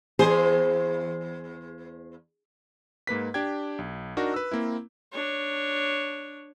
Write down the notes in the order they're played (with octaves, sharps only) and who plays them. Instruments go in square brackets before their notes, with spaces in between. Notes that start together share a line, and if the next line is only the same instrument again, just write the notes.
[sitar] E2 C5 [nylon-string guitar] G#4
[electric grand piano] G#2 A#3 B4 B6
D4 G4 G5 G#6
B1
D4 D#4 F#4 A#4
B4 E6
A#3 C4 E4
[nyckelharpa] D4 C#5